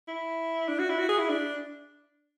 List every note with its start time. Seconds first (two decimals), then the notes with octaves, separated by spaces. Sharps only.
0.08 E4
0.68 D4
0.79 F#4
0.89 E4
0.99 F#4
1.09 G#4
1.19 E4
1.29 D4